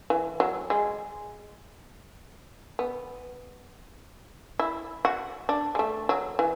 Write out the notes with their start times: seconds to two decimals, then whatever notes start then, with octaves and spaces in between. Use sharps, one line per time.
0.10 E3
0.40 F#3
0.70 G#3
2.79 B3
4.59 E4
5.05 F#4
5.49 D4
5.75 G#3
5.79 A3
6.09 F#3
6.39 E3